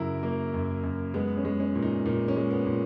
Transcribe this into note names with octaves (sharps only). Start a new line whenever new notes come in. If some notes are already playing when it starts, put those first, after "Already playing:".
Already playing: F#2 C#3 F#3 E4 A#4
F#3 A#3
F#2
F#2
G#3 B3
C#4
G#3
C#4
A#2
D#4
A#2 D#4
C#4
G#3
B3
A#2